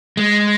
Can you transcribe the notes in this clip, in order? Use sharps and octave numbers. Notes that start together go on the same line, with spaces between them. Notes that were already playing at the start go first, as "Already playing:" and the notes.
G#3